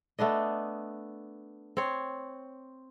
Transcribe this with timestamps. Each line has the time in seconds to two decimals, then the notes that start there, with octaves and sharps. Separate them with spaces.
0.19 A3 B3 D4 D#5
1.77 C4 C#5